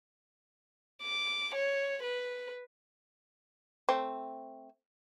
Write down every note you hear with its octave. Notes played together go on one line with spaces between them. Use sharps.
D6
C#5
B4
A3 C4